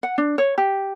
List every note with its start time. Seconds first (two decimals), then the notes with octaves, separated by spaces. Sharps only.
0.03 F#5
0.18 D4
0.38 C#5
0.58 G4